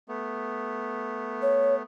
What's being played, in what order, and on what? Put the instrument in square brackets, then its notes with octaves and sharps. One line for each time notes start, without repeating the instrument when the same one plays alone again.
[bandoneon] A3 B3
[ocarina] C#5